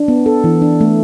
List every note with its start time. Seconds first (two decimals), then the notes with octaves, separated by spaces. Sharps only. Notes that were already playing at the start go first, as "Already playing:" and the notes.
Already playing: D4
0.08 B3
0.26 A4
0.44 E3
0.62 D4
0.81 A3